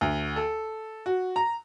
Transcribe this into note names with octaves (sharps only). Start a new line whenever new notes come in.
D2
A4
F#4
A#5